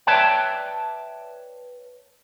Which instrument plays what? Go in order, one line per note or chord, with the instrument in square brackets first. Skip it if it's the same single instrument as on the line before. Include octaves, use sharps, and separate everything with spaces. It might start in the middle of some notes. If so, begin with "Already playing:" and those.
[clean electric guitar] B4 C#5 D5 E5 G5 A5